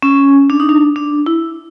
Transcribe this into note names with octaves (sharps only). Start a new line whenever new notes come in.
C#4
D4
D#4
D4
D4
E4